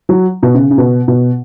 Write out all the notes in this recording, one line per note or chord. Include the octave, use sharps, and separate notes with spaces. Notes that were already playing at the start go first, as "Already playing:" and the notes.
F#3
B2
C#3
C#3
B2
B2